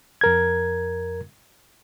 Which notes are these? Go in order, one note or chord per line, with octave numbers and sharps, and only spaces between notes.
F2 A#4 G#6